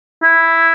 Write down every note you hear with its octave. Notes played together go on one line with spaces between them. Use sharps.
E4